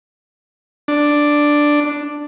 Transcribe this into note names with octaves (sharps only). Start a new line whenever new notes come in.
D4